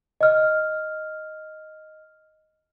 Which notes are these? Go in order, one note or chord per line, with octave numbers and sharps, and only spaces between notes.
D#5 F6